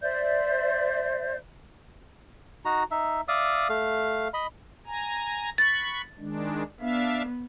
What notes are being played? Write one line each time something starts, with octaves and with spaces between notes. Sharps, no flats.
C5 D5 E5 G6
D#4 F#4 A#5
D#4 E5
D5 E5 F5 D#6
A3 F5
D#5 B5
G#5 A#5
B5 C#6 F#6 A6
D#3 G#3 D4
B3 D4 E5 F5